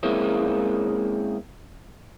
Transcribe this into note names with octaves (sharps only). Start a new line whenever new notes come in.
G#3 A#3 C4 C#4 E4 G#4